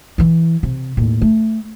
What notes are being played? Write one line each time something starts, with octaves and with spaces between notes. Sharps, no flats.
E3 E4
C3
D#2 A2
A3